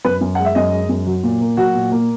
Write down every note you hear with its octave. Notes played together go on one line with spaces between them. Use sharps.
F#2 B4
F#2
G#3 F#5
E5
F#2 D#5
G#3
F#2
F#3
A#2
A#3
F#3 F#4
A#2
A#3